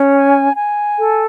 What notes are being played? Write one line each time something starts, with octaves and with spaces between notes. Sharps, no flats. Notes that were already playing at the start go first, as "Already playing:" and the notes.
Already playing: C#4
G#5
G#5
A4